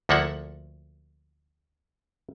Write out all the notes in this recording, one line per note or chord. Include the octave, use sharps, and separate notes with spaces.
D2 F3 A#3 A4 E5 F#5